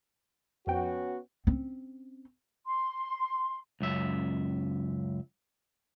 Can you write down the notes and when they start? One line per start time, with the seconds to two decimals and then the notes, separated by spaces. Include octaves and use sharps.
0.67 F2 F3 B3 C#4 F#4 G5
1.47 C4 C#4
2.65 C6
3.81 C#2 F#2 E5